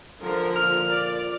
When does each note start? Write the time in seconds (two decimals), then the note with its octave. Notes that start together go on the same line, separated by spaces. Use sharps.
0.21 D3 F3 A#4
0.56 A#2 F6
0.89 D5